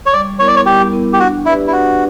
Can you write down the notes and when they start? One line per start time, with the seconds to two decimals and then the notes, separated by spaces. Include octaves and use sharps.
0.06 C#5
0.13 G3 D5
0.39 B3 E4 A#4 C#5
0.47 D5
0.56 C#5
0.66 G3 G4
0.92 B3 E4 A#4
1.13 G4
1.19 D4 F#4
1.46 E4 G4 B4 D5
1.67 E4
1.72 D4 F#4